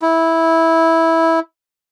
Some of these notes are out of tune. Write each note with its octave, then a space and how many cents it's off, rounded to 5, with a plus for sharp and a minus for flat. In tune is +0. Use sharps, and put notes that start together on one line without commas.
E4 -10